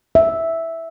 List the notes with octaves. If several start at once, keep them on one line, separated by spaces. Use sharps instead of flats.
E5